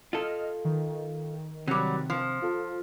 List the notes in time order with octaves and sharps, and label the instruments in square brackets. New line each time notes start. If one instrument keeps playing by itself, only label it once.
[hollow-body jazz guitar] F4 A4 [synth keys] D#5 F6
[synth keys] D#3
[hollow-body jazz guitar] C3 [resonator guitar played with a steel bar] F#3 G3
[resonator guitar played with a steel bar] F3
[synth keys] F4 A4